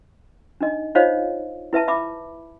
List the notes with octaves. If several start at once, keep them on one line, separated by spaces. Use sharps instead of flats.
D4 D#4 D#5
D#4 F4 C5 C#5 D#5 F5
E4 B4 E5 A5
E5 B5 D6